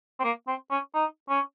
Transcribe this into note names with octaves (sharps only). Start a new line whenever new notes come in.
C4
A#3
C4
C#4
D#4
C#4